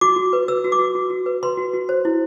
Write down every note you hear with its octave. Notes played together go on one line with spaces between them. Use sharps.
F#4 D6
F#4
B4
B4 E6
F#4
D6
F#4
F#4
F#4
B4
B4 C6
F#4
F#4
C5
E4